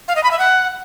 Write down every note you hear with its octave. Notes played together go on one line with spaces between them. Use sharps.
F5
D#5
B5
E5
F#5